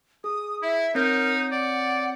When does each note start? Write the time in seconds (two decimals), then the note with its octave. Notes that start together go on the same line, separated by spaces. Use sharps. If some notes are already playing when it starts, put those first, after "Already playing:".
0.24 G#4 D#6
0.62 E4 E5
0.95 C4 D#4 A#4 C#5 G6
1.52 D5 F#5